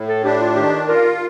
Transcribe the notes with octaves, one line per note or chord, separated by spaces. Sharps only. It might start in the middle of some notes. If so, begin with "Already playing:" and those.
Already playing: A2
A4
D4 G4
F4
D#3 G4
F4 A#4